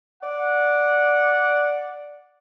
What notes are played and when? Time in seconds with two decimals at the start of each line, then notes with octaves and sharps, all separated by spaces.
0.22 D5 F#5